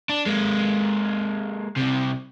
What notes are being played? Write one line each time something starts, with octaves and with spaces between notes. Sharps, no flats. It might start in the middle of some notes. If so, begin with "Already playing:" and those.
D4
G#3 A#3
C2 C3